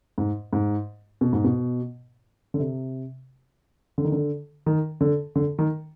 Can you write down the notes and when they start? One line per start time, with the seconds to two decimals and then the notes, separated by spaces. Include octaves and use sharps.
0.18 G#2
0.53 G#2
1.21 B2
1.33 G#2
1.44 B2
2.54 D3
2.59 C3
3.98 D3
4.04 D#3
4.12 D3
4.66 D#3
5.01 D3
5.36 D3
5.59 D#3